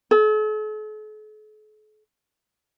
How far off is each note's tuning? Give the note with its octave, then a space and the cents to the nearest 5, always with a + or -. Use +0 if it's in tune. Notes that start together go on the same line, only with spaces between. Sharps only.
A4 -45